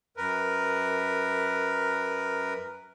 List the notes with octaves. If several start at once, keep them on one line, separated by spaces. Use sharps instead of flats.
F#2 A#4 B4